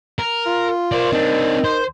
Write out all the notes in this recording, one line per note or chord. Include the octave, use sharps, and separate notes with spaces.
A#4
F4
A#4 C5 D5
C4 D4 D#4
C5